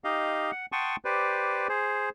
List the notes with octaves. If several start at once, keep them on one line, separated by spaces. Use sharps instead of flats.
D#4 G4 D#5 F5
F#5
F#5 G5 A5 C6 C#6 D#6
G4 B4 C5 D5
G#4 C5